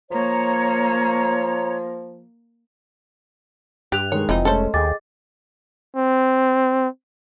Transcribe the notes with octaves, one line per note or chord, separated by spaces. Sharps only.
F3 A#3 C#5 A#5
G2 G4 F#6 F7
D#3 G#3 C#5
F1 E3 F3 C4 D#4 D#5
G#3 A3 C#4 A4 C5
D#2 G#4 D#5 G5 G#5 D6 A6
C4